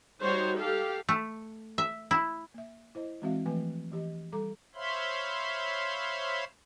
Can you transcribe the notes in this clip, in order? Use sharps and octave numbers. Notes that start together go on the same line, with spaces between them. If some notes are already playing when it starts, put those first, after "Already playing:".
G3 D#4 F#4 C5 C#5
G4 A4 F5
A3
E5
E4
A#3 E5
E4 C5 D#5
E3 G#3 C4 F#4 E5 F5
E3 F3 A3 B4 G#5
E3 G4 D#5
G3 A4 A#5 D6
C5 C#5 E5 F5 B5 C6